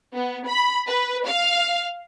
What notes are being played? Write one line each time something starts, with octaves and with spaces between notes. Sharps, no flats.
B3
B5
B4
F5